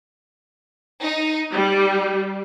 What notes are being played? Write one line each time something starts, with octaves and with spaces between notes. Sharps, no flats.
D#4
G3